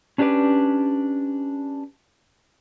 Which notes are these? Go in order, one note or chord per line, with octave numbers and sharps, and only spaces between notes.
C#4 D4 G4 G#4 B4 D5